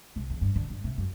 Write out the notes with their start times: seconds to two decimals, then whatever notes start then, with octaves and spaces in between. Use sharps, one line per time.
0.16 C2
0.30 E2
0.41 G2
0.56 D3
0.70 G2
0.84 C3
0.98 F#2